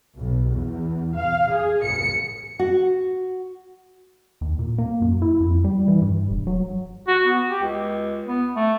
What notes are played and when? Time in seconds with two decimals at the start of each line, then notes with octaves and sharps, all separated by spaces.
0.16 B1
0.51 E2
1.15 F5
1.53 G#4
1.84 C#7
2.59 F#4
4.41 D#2
4.59 A#2
4.78 A#3
5.02 F#2
5.22 E4
5.41 F2
5.64 G3
5.88 E3
6.02 G2
6.31 E1
6.47 F#3
7.07 F#4
7.25 B3
7.49 G4
7.63 C#2
8.27 B3
8.56 A3